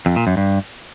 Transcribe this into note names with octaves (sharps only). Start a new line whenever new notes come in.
F2
A#2
F#2
G2